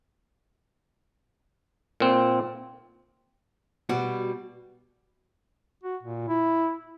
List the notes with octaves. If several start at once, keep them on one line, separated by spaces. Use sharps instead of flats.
A#2 C4
B2 G3 F#4
F#4
A#2
E4